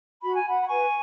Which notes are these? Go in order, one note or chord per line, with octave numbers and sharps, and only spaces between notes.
F#4 B5
G#5
F#5 B5
B5
B4 G#5 C#6